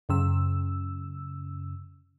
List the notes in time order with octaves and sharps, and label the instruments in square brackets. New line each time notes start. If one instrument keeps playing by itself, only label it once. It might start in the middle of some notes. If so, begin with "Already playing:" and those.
[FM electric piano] F#2 C#3 E6